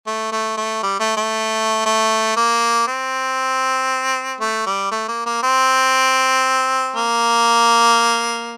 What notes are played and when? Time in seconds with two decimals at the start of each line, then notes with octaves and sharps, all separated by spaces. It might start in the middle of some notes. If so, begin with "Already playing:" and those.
0.06 A3
0.32 A3
0.57 A3
0.83 G3
1.00 A3
1.17 A3
1.86 A3
2.37 A#3
2.87 C4
4.40 A3
4.66 G3
4.91 A3
5.08 A#3
5.26 A#3
5.43 C4
6.96 A#3